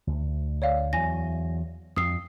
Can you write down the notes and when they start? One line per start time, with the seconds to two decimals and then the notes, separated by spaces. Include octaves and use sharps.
0.07 D2
0.62 C#5 D5 F5
0.93 E2 F#3 G#5 A#6
1.96 F2 D#6 E6 C7